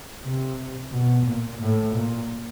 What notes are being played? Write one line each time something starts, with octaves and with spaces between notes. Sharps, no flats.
C3
B2
A#2
A2
A#2